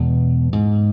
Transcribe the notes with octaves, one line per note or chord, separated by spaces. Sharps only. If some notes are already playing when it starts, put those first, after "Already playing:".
Already playing: E2 B2 G#3
G#2